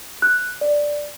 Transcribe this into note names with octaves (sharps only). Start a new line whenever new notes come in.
F#6
D5